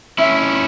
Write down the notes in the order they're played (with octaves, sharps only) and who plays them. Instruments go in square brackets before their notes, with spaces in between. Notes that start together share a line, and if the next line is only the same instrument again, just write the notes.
[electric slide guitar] C#4 E4 [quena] E5